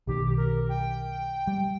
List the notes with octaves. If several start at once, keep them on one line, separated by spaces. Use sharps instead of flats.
B1 D#3 G4
A#4
G5
G3